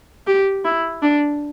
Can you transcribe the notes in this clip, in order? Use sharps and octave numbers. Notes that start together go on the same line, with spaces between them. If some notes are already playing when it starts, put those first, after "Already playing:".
G4
E4
D4